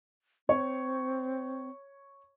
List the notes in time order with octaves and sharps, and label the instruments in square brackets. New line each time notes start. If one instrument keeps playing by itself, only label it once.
[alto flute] C4 [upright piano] C#5